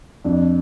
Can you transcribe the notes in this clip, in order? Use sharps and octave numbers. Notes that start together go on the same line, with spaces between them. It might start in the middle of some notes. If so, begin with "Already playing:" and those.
F2 D4